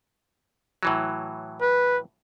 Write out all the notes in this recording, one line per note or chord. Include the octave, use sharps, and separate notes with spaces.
A2 E3 F#3
B4